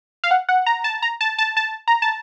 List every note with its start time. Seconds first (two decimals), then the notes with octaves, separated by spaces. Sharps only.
0.24 F5
0.31 F#5
0.49 F#5
0.66 A#5
0.84 A5
1.02 A#5
1.21 A5
1.39 A5
1.57 A5
1.88 A#5
2.02 A5